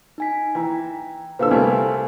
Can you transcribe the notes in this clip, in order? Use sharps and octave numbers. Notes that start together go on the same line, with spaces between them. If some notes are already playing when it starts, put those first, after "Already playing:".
D#4 G#5 B6
E3 G5 A#5
A#2 D3 B4 C5 F5 E6
C2 A3 G#5